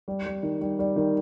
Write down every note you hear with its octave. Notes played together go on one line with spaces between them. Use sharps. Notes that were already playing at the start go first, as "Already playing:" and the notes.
G3
G3
D#3
G3
G3
D#3